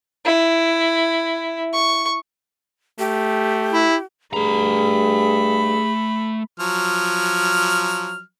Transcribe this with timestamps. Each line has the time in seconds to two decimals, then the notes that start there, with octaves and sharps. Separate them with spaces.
0.25 E4
1.73 C#6
2.99 A3 G4
3.72 E4
4.33 G2 A3 G#4 A#5 B5
6.60 F3 F#3 F6